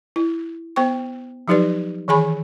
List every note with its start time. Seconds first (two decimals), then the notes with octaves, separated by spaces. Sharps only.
0.16 E4
0.76 B3 C5 G5 C#6
1.48 F3 F#3 D#4 G4 B4 D5
2.08 D#3 E3 G#4 G#5 B5